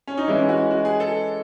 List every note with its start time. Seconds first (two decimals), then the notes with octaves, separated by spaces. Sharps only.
0.07 C#4
0.17 D#4
0.28 E3 G#3 C#4 E4
0.49 F#4
0.71 F#4
0.85 G#4
1.00 A4